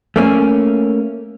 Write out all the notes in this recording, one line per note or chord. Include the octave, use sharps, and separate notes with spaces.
A3 A#3 C#4